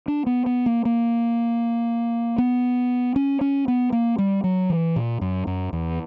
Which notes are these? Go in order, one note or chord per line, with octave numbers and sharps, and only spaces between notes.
D4
B3
B3
A#3
A#3
B3
C#4
C#4
B3
A#3
G3
F#3
E3
A#2
F#2
F#2
E2